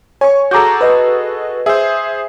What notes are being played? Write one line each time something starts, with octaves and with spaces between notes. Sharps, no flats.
C#5 G#5 C#6
F#4 G#4 A4 A#5 D6 G6
B4 D#5
G#4 C5 E5